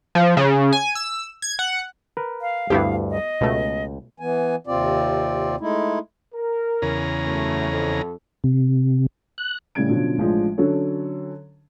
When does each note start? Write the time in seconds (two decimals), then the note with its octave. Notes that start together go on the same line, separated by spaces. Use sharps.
0.15 F3
0.37 C#3
0.73 G#5
0.95 E6
1.42 G#6
1.59 F#5
2.17 A#4 B4
2.42 F5
2.70 D2 G2 B3 E4 G4
3.10 D#5
3.41 C#2 B2 A3
4.20 E3 B3 G#5
4.67 D#2 C3 C4 F4 D5
5.60 G#3 A3 D#4 E4
6.35 A#4
6.82 E2 C#3 A#5
7.24 F#2 A3
7.71 F2 A4
8.44 C3
9.38 F#6
9.75 A2 C#3 G3 G#6 D7
9.88 B2 D3 F3 F#3 C#4
10.18 A1 F3 G#3 D4
10.58 D3 F#3 C#4 A4 C#5